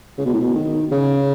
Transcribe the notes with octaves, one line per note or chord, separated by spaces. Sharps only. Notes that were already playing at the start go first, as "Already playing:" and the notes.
C#3
B2
A2
B2
D#3
C#3